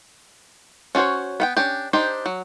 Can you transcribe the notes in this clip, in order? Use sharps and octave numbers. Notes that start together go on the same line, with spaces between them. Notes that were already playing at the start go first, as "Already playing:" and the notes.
C#4 D4 F#4 C5 C#5
B3 F#5 G5
C#4 D4 G4
D4 D#4 G4 C5 G5
F#3